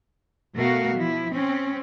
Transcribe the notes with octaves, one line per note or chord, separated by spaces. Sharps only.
B2 A3 F#4 A#4 F5
F3 E4
C4 C#4